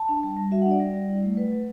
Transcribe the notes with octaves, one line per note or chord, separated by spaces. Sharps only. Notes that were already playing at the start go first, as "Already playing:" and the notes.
Already playing: A5
D4
G3
G3
F#4 E5
F#5
D4
D5
G3
G3
E4
A3
F#3 B4
F#3